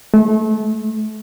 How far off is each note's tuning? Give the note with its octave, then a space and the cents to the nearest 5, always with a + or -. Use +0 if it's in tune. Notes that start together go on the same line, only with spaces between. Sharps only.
A3 -30